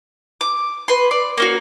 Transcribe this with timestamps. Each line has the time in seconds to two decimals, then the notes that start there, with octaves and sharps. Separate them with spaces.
0.41 D6
0.88 B4 C6
1.11 D5
1.38 A#3 C#4 F#4